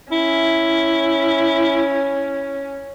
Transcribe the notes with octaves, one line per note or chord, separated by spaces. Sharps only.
C#4 E4